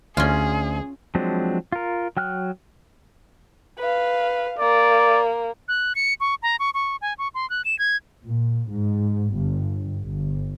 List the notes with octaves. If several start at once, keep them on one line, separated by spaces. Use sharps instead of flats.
D2 C#4 F4 G#4
F3 F#3 G#3 C4 D4
F4 A#4
F#3 G5 F6 F#6
B4 F5
A#3 D5
F#6
C#7
C#6
A#5
C#6
C#6
G#5
C#6
C6
F#6
E7
G#6
A#2
G#2
G1
G1